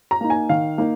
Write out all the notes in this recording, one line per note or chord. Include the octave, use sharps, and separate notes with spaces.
A#5
A#3 D#4
G#5
D#3 F5
A#3 D#4